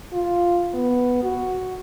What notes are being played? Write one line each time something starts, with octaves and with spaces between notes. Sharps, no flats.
F4
B3
F#4